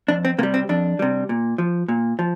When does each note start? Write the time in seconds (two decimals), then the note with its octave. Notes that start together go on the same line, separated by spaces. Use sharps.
0.08 F2 D4
0.25 C4
0.38 C3 A#3
0.43 G3
0.54 C4
0.69 F2 D4
0.99 C3 G3
1.29 A#2
1.58 F3
1.89 A#2
2.19 F3